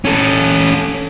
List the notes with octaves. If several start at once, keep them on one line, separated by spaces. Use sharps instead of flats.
C#4 A4